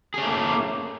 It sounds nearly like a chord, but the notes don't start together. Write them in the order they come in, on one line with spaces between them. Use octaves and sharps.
G#4 C#4 A3 A#3